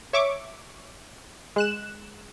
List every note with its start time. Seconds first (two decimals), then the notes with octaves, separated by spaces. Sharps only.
0.13 C#5 E5 C#6 D6
1.56 G#3 F#6 E7